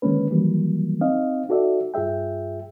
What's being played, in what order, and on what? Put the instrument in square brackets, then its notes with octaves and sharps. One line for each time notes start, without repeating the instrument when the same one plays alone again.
[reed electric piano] D3 D#3 G#3 A#3 C#4 B4
D#3 E3 F#3 G3 A#3
C4 D#4 D#5 F5
D#4 F#4 A4 D5 E5
G2 F4 G#4 E5 G5